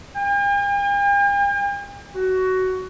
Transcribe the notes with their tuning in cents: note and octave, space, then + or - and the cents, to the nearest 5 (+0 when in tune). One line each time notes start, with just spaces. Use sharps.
G5 +45
F#4 +15